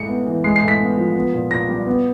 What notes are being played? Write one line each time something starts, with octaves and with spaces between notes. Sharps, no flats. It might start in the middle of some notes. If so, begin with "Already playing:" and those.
Already playing: A2 G#3 C#7
B3
E3
G#3 C7
C7
A2
B6
B3
F3
B3
A#2
A#2 A#6
G3
B3